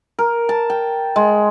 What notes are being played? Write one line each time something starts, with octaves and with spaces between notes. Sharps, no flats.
A#4
A5
G5
G#3